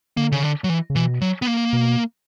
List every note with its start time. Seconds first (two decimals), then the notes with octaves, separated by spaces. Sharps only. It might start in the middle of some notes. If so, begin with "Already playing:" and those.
0.17 D3 A#3
0.32 C#3
0.43 D3
0.64 F#3
0.69 E3
0.90 C#3
0.95 B2 E3
1.21 F#3
1.42 B3
1.47 A#3
1.73 B2